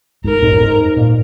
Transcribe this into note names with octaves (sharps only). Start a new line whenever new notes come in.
G#2 A#4
G#2
F#2
G#2
A#2